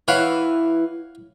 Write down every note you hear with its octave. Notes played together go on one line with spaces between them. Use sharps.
E3 E4 C#5 F5 F#5